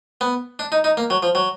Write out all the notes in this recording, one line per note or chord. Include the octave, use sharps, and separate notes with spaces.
B3
D4
D#4
D#4
A#3
F#3
F3
F#3